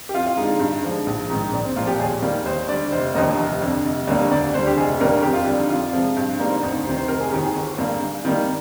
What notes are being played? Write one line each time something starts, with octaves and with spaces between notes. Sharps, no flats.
G4
F2 F4
F4
D3 G#3 D#4
G2
D3 F3 G#3
A#1
G#2 D#3
A#1 D4
C4
A#2 F3 F4
G4
D#2 G#4
D#3 G3 A#3 A#4
D#2 C5
D3 G3 D5
F1 C5
D#2 D3 F3 A#3 D#5
F1
F2 D3
F1
D#2 D3 G3 A#3
D2 D5
D3 G3 C5
G4
F1 G#4
D#2 D3 G3 A#3 A#4
F2 G4
F4
D3 G3 G4
D#4
F2 F4
C3 F3 G#3
G2
D3 G3 A#3 D#4
C4
D4
D2 D#4
C3 D#3 C5
C5
F1 A#4
G#4
D#2 D#3 G4
G#4
G1
G2 D3 G3 A#3
G2
D#3 G3 A#3